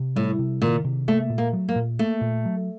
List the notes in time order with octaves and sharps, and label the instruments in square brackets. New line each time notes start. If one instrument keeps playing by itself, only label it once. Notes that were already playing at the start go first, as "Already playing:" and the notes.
Already playing: [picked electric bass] C3
[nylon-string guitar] A2 [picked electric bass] G3
[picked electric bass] C3
[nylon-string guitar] A#2 [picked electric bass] D#3
[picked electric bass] C3
[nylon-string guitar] A3 [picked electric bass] A#3
[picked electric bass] A#2
[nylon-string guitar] A#3
[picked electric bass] F#3
[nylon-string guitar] A#3
[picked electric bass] A#2
[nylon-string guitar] A3 [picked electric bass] A#3
[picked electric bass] A#2
F#3